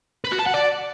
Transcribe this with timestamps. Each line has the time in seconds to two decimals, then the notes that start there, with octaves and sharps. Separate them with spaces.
0.25 B4
0.32 F#4
0.39 A5
0.47 F#5
0.54 D5